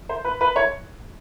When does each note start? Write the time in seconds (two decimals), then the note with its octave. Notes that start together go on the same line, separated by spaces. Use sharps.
0.09 C5
0.25 B4
0.41 B4
0.56 C#5